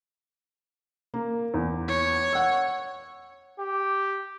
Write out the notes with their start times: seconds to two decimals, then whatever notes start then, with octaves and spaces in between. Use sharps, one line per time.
1.14 A#3
1.54 E2
1.88 C#5
2.33 F#5 E6
3.60 G4